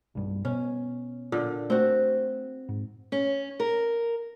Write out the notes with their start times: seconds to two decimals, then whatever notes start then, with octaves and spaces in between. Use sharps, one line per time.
0.15 B1 G2
0.45 B2 C#4
1.32 A#2 D3
1.70 A3 C4 F#4
2.69 G#2
3.12 C#4
3.60 A#4